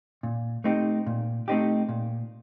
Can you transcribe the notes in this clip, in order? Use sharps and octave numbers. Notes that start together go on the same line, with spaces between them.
A#2
A3 C4 D#4 G4
A#2
A3 C4 D#4 G4
A#2